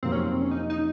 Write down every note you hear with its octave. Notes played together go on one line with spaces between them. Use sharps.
F2 C3 D#3 F#3 A#3 C4
C#4
C4
C#4
D#4
D#4